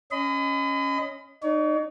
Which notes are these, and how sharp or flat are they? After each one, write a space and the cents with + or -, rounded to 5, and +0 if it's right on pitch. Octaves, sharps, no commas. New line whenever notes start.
C#4 +0 D#5 +0 B5 +40
D#4 -30 C#5 +40